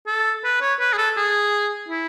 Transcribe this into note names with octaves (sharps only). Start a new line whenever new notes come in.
A4
B4
C#5
B4
G#4
A4
G#4
E4